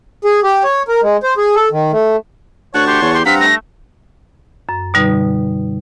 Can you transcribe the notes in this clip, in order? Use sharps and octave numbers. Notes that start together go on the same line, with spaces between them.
G#4
G4
C#5
A#4
G#3
C5
G#4
A4
D#3
A3
D2 C#5 F#5 A5 C#6 F#6
G4 C6
E2 C#5
G4 C6
G2 C4 F5 F#5 A#5 B6
A3 A#6
F#2
B2 D3 G3 D#4 B4